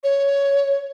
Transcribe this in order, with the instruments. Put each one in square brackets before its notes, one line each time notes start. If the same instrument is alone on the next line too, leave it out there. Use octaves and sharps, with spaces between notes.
[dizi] C#5